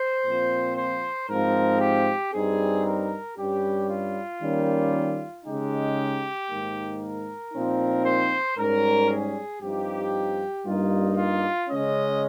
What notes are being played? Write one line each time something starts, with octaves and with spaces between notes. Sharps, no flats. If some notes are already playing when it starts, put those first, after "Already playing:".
Already playing: C5
A#2 F3 C4
C5
G#2 F3 C4 A#4
G4
G2 G3 C4 D#4 G#4
A#4
G2 G3 C#4 G4
F4
D#3 G3 A#3 C#4
C#3 G#3 D#4 G4
G#2 D#3 A#3
A#4
A#2 F3 C4 D#4
C5
G#2 G3 C#4 A#4
G#4
G2 F3 C4 D#4 G4
G2 G3 A#3 D#4 F4
F4
C#3 G#3 C#4 D#5